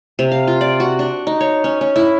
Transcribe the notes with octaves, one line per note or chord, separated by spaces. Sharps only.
C3
F5
F4
D5
F#4
D4
D#4
C#5
C#4
C#4
E4